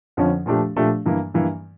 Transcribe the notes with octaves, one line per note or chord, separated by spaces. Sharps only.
F2 D3 F3 C#4
A#2 F3 A3 D4 G4
A#2 F3 A3 D4 G4
G2 E3 A#3
G2 E3 A#3